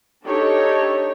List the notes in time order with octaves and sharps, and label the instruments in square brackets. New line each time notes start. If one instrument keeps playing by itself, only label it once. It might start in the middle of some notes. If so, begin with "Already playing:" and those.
[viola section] D4 D#4 G4 A4 C#5